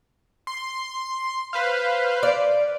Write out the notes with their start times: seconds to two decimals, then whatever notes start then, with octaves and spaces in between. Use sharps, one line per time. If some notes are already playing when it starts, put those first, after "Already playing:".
0.47 C6
1.53 B4 C5 F5
2.23 D5